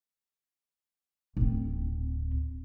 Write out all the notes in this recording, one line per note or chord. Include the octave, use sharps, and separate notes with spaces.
D1 C4